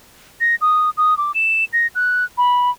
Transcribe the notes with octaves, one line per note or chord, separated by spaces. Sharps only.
A#6
D#6
D#6
D6
E7
A#6
F#6
B5